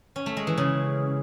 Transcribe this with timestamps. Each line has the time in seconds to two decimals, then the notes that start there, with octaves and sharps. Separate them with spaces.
0.16 C#4
0.26 A3
0.37 G#3
0.47 E3
0.57 C#3